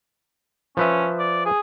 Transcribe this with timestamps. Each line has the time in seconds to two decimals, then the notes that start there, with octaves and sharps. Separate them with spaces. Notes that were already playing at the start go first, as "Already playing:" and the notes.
0.77 F3 C#4 B4 E5
1.19 D5
1.45 G#4